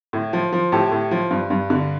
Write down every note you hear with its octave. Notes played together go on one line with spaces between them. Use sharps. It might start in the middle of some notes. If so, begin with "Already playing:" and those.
A2
F3
F3
A2 G4 A4
A2
F3
G2
G2
D3